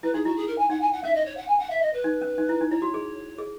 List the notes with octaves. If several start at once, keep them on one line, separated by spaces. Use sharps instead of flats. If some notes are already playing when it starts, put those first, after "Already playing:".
E4 B4
D#4 G#4
E4 F#4
G#4
A#4
G#5
D#4 F#5
G#5
F#5
C#4 E5
D#5
C#5
F#5
G#5
F#5
E5
D#5
B4
D#4
C#4
D#4
E4
D#4
E4 C#5
F#4
G#4
G#4